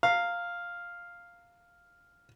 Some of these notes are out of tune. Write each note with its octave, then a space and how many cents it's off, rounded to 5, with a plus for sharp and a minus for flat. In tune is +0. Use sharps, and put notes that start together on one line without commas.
F5 +0 A#5 -25